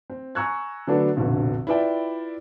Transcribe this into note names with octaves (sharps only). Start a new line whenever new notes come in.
C4
G#5 A#5 C#6 E6 F#6 G#6
D3 F#3 A3 B3 D4 A4
F1 A#1 F2 B2 D3
E4 F4 B4 D5 E5 G5